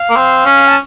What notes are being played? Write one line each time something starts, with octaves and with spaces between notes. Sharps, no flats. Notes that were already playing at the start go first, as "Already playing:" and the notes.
Already playing: F5
A#3
C4
C#4
A5